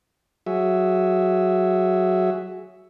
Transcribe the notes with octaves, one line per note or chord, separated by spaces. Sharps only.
F#3 F#4 G#4 E5